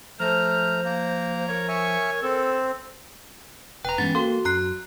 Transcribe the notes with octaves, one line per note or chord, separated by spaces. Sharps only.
F3 A3 C5 A#5 F6
A#3 A#5
A#4 C#5
E5 G#5 C#6
C4 A4
E1 B4 G5 A#5
E2 G2 G#3 B3 C#4 A6
A#3 F#4 A4 C6
F#2 A#5 F#6 C7